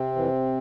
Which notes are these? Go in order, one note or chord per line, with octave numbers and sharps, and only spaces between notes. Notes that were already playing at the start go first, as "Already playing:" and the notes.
Already playing: C3 C4
F2 E3